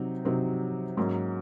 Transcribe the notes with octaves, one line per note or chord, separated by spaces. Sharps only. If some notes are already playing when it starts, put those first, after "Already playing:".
Already playing: C3 F#3 C4 D#4
C3 F#3 C4 D#4
G#2 F#3 A#3 C#4